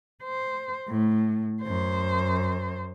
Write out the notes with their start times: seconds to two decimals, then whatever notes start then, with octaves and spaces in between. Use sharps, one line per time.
0.24 C5
0.88 A2
1.63 F#2 C5